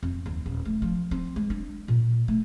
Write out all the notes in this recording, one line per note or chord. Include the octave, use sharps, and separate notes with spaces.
F2
D#2
D#1
A3
F3
C4
G#3
D4
A#2
A3